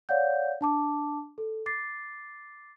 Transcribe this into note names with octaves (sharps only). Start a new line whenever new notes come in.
C#5 D5 F5 F#5 G6
D4 A5 D6
A4
D6 A6 C7